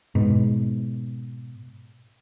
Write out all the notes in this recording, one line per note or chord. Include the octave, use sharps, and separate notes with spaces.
G#2 B2